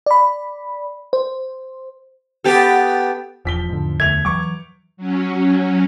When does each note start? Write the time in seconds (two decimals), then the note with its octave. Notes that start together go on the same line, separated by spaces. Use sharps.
0.06 D5 B5
1.13 C5
2.44 B3 G4 A4
3.45 E1 E2 F3 B6 G7
3.69 G#2 D3
4.00 D2 D3 A3 E5 G#6 F7
4.25 E3 F#3 C#6 D6
4.97 F#3 C#4